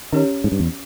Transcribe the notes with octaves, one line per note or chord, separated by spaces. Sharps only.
D#3 C#4 G4 C#5
G#2
G2
E2